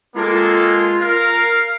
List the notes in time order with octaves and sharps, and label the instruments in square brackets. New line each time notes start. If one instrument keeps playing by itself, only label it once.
[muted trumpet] G#3 [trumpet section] A#3 C4 A4 [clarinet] F4
[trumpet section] A#4 [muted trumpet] F5